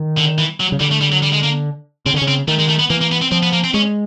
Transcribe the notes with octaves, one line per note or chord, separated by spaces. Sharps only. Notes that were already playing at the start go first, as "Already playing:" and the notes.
Already playing: D#3
D3
E3
F#3
C#3
D3 G3
A3
G3
F#3
G3
G#3
A#3
C#3 C4
D3
C#4
C#3
C4
D#3 A3
G#3
A3
B3
E3 A#3
A#3
B3
C4
F3 C4
B3
A#3
C4
G#3 C#4